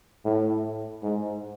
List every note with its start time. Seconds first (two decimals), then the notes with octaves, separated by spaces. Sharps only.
0.25 A2
1.03 G#2